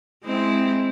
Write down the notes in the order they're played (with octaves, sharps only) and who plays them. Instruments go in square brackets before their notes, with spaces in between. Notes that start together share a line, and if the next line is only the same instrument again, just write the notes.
[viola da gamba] G#3 C4 E4